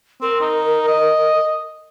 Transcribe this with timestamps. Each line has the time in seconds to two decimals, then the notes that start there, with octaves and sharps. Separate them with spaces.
0.22 C4 A#4
0.41 D#4
0.88 D#5